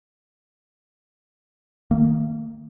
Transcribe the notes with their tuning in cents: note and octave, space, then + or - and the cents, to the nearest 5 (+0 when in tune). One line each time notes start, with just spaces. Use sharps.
D#3 +5 A#3 -35